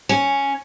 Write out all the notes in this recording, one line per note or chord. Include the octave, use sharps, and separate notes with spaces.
C#4